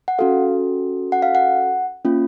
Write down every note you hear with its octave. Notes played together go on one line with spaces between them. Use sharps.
F#5
C#4 F#4 A4 F5
F#5
F5
F#5
A#3 C#4 F4